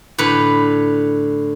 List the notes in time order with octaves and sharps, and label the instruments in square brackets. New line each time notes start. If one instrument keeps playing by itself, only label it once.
[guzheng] A2 D3 B4